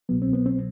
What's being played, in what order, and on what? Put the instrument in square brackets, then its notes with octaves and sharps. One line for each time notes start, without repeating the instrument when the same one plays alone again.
[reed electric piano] C2 B2 F#3 B3
C4
B3
C4